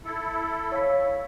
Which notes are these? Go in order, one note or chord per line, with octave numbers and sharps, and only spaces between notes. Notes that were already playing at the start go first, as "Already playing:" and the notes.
E4 A4
C#5 F5 B6